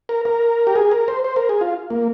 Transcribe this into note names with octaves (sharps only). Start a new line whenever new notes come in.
A#4
A#4
G4
G#4
A#4
C5
C5
A#4
G#4
F4
A#3